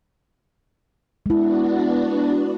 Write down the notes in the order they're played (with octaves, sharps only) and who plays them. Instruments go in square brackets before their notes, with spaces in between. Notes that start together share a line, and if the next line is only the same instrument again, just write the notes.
[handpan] G#3 E4 [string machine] B3 D4 F#4